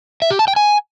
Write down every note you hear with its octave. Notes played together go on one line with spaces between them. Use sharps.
E5
G4
A5
G5
G#5